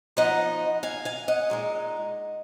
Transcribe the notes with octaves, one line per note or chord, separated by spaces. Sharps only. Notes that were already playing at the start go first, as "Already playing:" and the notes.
F3 B3 D#4 D#5 F#5
F5 G#5
F5 G#5
D#5 F#5
A#2 G#3 D#4